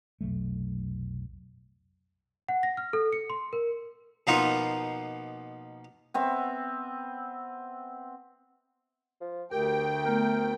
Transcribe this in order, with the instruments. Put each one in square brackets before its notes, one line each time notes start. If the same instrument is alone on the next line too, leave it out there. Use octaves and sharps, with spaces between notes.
[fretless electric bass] F1 B1 F#3 A3
[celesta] F#5
A#6
F6
A4
C#7
C6
A#4
[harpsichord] B2 F3 A#3 B3 D#4 F4
[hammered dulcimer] B3 C4 E5
[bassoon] F3
[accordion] D2 G5 [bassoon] G4 [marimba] A#4
[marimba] A3 B3 [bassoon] A#4